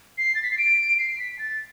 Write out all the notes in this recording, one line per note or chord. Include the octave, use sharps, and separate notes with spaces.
C7
A6
B6
C7
D7
C7
B6
A6